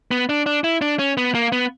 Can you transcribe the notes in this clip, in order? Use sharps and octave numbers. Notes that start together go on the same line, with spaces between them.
B3
D4
D4
E4
D4
C#4
B3
A#3
B3